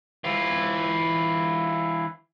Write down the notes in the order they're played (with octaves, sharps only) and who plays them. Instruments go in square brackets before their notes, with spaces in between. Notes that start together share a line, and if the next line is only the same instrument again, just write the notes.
[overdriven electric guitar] E3 F4